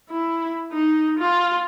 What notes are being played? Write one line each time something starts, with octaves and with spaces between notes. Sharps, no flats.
E4
D#4
F4